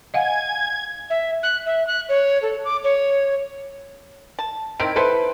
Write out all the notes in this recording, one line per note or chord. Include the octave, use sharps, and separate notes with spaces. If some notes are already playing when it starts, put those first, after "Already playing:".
D#5 F5 F#5 G#5 G#6
E5
F#6
E5
F#6
C#5
A4
D6
C#5
A5
D#3 C4 E4 D7
E4 A4 B4 C5 A5